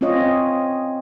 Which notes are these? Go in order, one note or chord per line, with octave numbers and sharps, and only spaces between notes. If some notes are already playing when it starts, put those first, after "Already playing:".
C4 C#4 F4 C#5 D#5